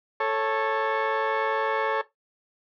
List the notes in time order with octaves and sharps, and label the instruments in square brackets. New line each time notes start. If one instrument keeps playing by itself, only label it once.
[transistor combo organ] A4 C#5